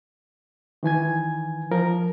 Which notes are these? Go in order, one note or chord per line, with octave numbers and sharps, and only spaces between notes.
D#3 E3 G#5 G#6
F3 A#4